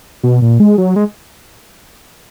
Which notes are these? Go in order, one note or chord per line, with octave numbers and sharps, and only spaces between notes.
B2
A#2
G#3
F#3
G#3